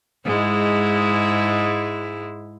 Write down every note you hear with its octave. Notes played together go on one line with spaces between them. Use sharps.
G#2 G#3 E4